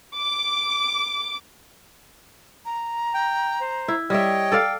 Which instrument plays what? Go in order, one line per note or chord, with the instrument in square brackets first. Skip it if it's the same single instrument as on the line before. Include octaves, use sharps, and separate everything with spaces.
[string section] D6
[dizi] A#5
[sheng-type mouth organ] G5
C5
[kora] E4
[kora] G3 E5 [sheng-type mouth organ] C#5 D#5 [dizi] G5
[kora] A4 D5 F5